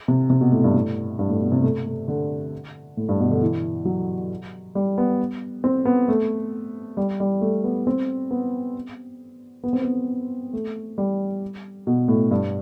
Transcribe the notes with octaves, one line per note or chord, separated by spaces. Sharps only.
C3
C3
B2
A2
G2
A2
G2
A2
B2
C3
A3
A3
D3
A2
G2
B2
D3
E3
F#3
G3
B3
C4
B3
A3
G3
G3
A3
B3
C4
B3
B3
C4
B3
A3
G3
B2
A2
G2